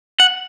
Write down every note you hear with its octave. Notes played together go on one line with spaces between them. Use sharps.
F#5